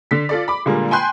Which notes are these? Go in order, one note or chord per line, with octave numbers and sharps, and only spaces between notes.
D3 B6
F4 A4 D5
B5 D6
A#2 D3 G3 G#3 A#3
G5 G#5 B5 C6 F#6 G6